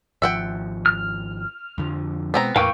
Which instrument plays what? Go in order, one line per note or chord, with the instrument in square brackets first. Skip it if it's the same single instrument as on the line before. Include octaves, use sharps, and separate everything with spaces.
[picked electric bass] G#1 F3 [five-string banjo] E5 F#5 G5
[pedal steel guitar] F6
[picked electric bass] F2 D3 F3
[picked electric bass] B2 G#3 [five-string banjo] B3 C4 A#5
[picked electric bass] E2 A2 [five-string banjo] E3 A#3 B4 [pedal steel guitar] F5 G5 C#6